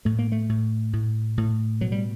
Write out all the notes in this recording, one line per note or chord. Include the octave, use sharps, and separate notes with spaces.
A2 A3
A#3
A3
A2
A2
A2
B2 F#3
G3